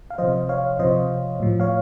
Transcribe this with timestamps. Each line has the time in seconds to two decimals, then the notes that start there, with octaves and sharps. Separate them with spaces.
0.10 F5
0.18 C3 F3 C5 D#5
0.49 C#5 F5
0.79 C3 F3 C5 D#5
1.40 A2 F3
1.60 C#5 F5